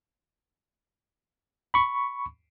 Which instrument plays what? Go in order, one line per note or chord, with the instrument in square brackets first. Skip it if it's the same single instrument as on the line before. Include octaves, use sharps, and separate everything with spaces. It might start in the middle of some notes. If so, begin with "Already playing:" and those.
[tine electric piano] B5 C#6